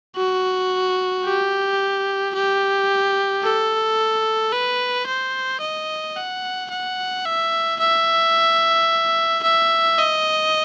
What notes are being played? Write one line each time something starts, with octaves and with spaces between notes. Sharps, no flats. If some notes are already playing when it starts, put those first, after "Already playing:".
F#4
G4
G4
A4
B4
C5
D#5
F#5
F#5
E5
E5
E5
D#5